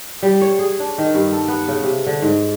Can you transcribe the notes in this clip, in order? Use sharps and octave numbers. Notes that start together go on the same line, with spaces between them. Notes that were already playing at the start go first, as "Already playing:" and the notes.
G3
C#5
G#4
D4
D#3
G2
A4
B3
C#3
C3
D3
G#2